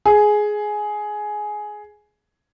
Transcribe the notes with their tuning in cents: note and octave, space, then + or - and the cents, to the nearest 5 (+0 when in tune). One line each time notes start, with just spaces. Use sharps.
G#4 +10